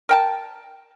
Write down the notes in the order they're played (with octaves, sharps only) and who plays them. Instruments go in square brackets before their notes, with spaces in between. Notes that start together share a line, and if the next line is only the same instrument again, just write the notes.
[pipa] A#4 G5 A5